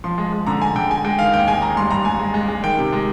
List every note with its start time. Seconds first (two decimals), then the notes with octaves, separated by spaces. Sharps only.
0.04 F3 C6
0.18 G#3
0.33 G#3
0.47 D3 A#5
0.62 G#3 G#5
0.75 D3 G5
0.90 G#3 G#5
1.04 G#3 G5
1.19 D#3 F5
1.33 D#2 G5
1.48 G#3 G#5
1.62 D#2 A#5
1.77 G2 C6
1.90 G2 A#5
2.05 G2 G#5
2.20 G#3
2.34 G#3
2.48 G#3
2.63 D#3 G5
2.78 C3
2.93 G#3